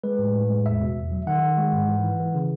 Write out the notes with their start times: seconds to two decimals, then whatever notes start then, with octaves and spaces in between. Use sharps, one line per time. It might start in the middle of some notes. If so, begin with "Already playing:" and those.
0.04 G#3 B4
0.19 A2
0.35 A2
0.50 G#3
0.66 E2 E5
0.81 B2
0.97 E2
1.12 F#3
1.27 D#3 F#5
1.42 D#3
1.58 G#3
1.73 G#2
1.88 E3
2.04 E3
2.20 E3
2.35 C#3